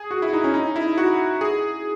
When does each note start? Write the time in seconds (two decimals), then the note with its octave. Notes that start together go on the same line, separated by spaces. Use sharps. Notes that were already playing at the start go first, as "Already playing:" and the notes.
Already playing: G#4
0.11 F#4
0.22 E4
0.33 D#4
0.44 C#4
0.54 D#4
0.76 E4
0.98 F#4
1.41 G#4